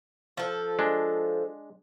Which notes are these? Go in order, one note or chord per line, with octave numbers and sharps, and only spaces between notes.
F3 A4
G#3 D4